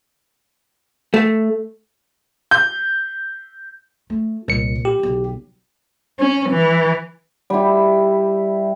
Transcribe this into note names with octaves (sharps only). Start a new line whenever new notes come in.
A3
G6
A3
C2 A#2 C#7
G4
B1 D3
C#4
E3
G3 E4